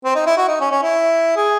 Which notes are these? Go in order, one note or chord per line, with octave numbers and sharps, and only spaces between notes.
C4
D#4
E4
F#4
D#4
C#4
C#4
E4
G#4